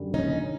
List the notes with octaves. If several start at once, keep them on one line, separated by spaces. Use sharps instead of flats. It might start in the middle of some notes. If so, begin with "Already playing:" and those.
Already playing: F#2 D3 G3
C#4 D#4